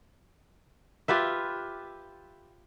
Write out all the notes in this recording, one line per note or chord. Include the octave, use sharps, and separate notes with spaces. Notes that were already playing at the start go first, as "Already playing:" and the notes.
F4 G4 B4 E5